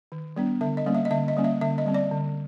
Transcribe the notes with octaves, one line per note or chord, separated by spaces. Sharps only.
D#3
G3 B3 D4
D3 E5
D#5
G3 A#3 C#4
E5
D#5
D3 E5
D#5
G3 A#3 C#4
E5
D3 E5
D#5
G3 C4
D5
D3